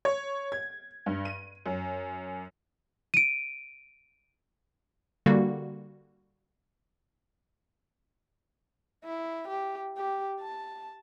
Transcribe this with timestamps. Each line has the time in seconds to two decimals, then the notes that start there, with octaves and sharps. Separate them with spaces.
0.05 C#5
0.52 G#6
1.06 G2
1.25 D#7
1.66 F#2
3.14 D7 D#7
5.26 D3 G3 A#3 F#4
9.04 E4
9.48 G4
9.97 G4
10.40 A5